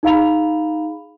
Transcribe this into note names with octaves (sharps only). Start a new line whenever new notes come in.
D#4 G#4 F5 A#5 B5 F7